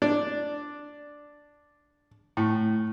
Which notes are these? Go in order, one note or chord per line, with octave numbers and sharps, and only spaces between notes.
D4
A2